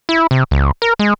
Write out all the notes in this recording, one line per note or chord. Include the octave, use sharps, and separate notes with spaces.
E4
C3
C#2
A#4
G#3